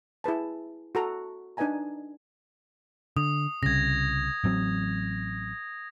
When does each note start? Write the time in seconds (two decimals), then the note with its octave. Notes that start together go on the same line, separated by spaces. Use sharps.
0.24 E4 G#4 B4 A5
0.95 F#4 A4 A#5
1.57 D4 D#4 B4 D#5 G#5 A#5
3.17 D3 D#6
3.63 C2 C#3 G#6 A#6
4.44 A1 F#3 C4